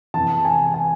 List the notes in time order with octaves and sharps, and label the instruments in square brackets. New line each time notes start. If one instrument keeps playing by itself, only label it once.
[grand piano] E2 C3 E3 A5
G#5
G#5